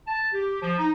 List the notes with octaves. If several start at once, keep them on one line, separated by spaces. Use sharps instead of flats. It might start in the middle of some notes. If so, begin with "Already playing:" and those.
A5
G4
F3
D#4